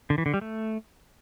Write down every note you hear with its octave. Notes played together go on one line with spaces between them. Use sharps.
D3
E3
D3
G3
A3